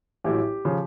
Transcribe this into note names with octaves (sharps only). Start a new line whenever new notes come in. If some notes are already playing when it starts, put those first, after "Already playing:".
A1 A2 F#3 G4
C#3 F3